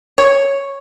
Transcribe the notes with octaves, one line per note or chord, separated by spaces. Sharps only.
C#5